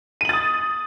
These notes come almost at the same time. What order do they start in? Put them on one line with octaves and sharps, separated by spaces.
D#7 F#7 A6 D#6